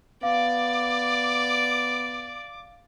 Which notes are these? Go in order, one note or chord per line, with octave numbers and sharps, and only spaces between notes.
B3 D5 F5 D6